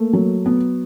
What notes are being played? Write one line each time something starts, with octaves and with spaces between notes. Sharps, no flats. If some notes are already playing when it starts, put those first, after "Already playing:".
Already playing: A3 A#3
F#3
B3